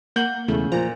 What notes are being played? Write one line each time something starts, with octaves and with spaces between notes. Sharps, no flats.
A#3 F#5 G6 F#7
E1 E2 C#3 A3
A#2 F3 A#5